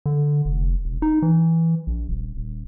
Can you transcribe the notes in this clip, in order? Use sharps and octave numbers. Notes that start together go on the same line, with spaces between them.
D3
F1
E1
D#4
E3
A#1
D#1
D#1